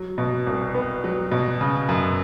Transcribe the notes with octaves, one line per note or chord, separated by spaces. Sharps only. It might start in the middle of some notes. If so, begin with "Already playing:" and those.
Already playing: F#3
B2
C2
B3
F#3
B2
C#3
F#2